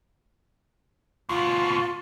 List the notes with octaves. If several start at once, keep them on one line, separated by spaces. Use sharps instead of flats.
D2 B2 F4